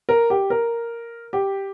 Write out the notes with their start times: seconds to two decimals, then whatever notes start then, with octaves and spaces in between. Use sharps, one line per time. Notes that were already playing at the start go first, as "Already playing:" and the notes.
0.09 A#4
0.30 G4
0.50 A#4
1.33 G4